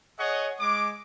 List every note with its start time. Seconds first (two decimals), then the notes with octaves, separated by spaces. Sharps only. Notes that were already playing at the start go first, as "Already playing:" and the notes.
0.18 G#4 C#5 D#5 F#5 C#6
0.60 G#3 D6